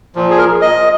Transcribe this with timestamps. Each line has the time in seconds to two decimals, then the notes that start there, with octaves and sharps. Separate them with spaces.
0.15 A#2 F3
0.30 G#4
0.38 A#4
0.61 D#5